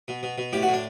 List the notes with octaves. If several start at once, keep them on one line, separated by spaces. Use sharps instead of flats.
B2
B2
B2
A2 G4
F#4
A2
D4